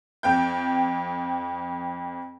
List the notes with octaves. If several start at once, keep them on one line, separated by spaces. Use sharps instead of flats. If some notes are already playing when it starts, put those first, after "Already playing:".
F2 G5 G6